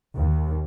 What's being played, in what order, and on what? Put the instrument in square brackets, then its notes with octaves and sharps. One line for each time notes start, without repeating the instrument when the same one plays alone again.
[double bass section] D#2